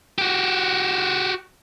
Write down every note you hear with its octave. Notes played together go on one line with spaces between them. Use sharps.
F#4 G4